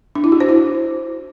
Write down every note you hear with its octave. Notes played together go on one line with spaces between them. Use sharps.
D4
E4
F#4
C5
E4